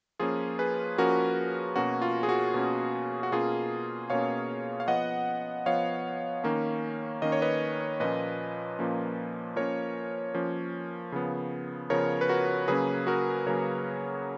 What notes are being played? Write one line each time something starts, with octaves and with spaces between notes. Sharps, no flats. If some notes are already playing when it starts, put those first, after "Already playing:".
F3 A#3 C#4 F4 G#4
G#4 B4
F3 A#3 C#4 F#4 A#4
B2 A#3 C#4 F#4
F4
G#4
F#4
B2 A#3 C#4
F#4
B2 A#3 C#4 F4 G#4
B2 A#3 C#4 C#5 F5
F5
F3 B3 D#5 F#5
F3 B3 C#5 F5
D#3 A#3 C#4
D#3 A#3 C#4 D#5
C#5
B4 D#5
A#2 F3 A#3 C#4 B4 D#5
A#2 F3 A#3 C#4
F3 A#3 C#4 A#4 C#5
F3 A#3 C#4
C#3 F3 B3
C#3 F3 B3 A#4 C#5
B4
F#4 A#4
C#3 F#3 A#3 C#4 G#4 B4
F#4 A#4
C#3 F#3 A#3 C#4 A#4 C#5